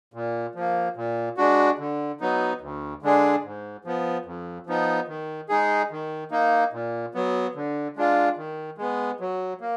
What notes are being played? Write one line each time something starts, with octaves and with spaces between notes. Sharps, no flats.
A#2
F3 A#3
A#2
G#3 D4 F#4
D3
F#3 B3 D#4
D2
D3 G#3 D4 G#4
G#2
F3 B3
F2
F3 B3 D#4
D#3
G#3 D#4 G#4
D#3
A#3 D#4
A#2
F#3 B3
D3
G#3 D4 F4
D#3
G#3 B3
F#3
A#3